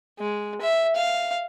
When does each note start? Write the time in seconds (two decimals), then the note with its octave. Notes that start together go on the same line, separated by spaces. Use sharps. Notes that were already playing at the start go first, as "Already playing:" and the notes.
0.19 G#3
0.61 E5
0.96 F5